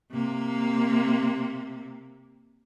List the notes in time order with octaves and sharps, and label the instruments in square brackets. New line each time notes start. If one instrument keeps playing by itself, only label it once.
[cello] C3 A#3